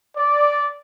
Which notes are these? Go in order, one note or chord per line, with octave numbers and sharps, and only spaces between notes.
D5